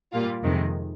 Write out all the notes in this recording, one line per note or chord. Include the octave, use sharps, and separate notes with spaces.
A#2 G3 A#3 F4
F2 C3 D#3 G#3